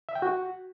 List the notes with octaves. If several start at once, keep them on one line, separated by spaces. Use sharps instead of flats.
E5
G5
F#4